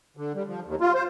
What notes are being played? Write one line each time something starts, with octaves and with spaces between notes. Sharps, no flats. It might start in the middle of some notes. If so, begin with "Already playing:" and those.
D3
G3
F3
D#2
F4
C5